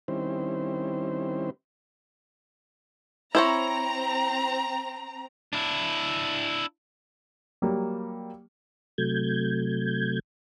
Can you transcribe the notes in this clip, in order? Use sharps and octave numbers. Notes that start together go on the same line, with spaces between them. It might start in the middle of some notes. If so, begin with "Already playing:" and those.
D#3 G3 C4 C#4 E4 C5
C4 E4 C5 C#5 A#5
D4 E4
F#3 G3 A#3
C3 F#3 A3 G6 G#6